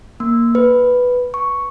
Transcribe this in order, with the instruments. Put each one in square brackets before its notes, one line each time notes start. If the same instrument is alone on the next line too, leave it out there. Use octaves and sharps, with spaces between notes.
[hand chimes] A#3
B4
C#6